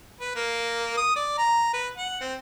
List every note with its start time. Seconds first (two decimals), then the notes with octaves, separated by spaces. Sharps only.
0.20 B4
0.35 A#3
0.97 D#6
1.16 D5
1.38 A#5
1.74 B4
1.96 F#5
2.21 C4